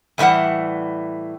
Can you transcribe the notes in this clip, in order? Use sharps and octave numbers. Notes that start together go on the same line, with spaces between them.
E2 A2 E3 G3 F#5